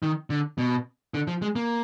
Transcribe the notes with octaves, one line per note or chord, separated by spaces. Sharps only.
D#3
D3
B2
D3
F3
G#3
A#3